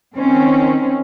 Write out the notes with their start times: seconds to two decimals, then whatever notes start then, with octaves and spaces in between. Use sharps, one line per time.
0.16 D#3 C4 C#4